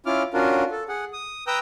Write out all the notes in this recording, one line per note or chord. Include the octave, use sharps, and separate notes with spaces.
C#4 E4 F4 D6 F6
C#4 D4 F4 F#4 A#4
A4
G#4 F#5
D#6
B4 G5 A#5 D#6 E6 G6